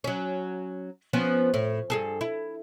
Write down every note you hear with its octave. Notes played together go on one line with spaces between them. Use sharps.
F#3 C#4
F3 B3 C#4
A2
G2 G#4 A4
E4